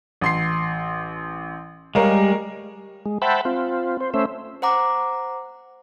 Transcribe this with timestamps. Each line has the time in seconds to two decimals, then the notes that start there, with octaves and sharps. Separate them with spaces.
0.21 A1 C6 C7
1.95 G3 G#3 A#4 C#5 F5
3.06 G#3
3.22 C5 E5 F#5 G5 A5 B5
3.45 C4 F4
4.01 C5
4.14 A3 C#4 C5 E5
4.62 C5 F#5 A#5 D6